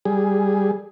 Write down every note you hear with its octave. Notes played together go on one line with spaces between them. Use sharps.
G3 G#4